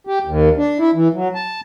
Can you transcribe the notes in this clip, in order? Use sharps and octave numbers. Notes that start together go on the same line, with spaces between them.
G4
D#2
D4
E4
E3
F#3
A5